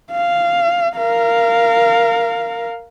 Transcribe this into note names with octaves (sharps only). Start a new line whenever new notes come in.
F5
A#4 F5